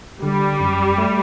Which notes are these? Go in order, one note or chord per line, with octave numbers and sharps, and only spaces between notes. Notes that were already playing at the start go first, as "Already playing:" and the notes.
D3 G3
F#2
A3